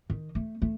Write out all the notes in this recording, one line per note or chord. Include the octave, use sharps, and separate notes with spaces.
D#3
A3
A3